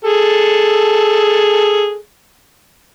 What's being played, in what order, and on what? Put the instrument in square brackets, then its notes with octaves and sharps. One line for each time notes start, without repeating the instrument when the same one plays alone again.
[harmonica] G#4 A4